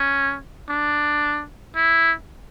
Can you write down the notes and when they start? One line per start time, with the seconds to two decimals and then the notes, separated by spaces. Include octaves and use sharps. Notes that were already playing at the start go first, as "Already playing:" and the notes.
Already playing: C#4
0.69 D4
1.76 E4